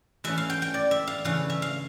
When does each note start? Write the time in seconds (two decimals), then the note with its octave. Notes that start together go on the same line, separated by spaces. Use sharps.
0.24 E3 A3 C#4 E5
0.38 F5
0.50 G5
0.62 G5
0.74 D5
0.91 E5
1.07 F5
1.25 C#3 E3 A3 C#4 F5
1.50 E5
1.62 F5